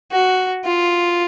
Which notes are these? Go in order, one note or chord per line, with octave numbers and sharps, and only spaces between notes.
F#4
F4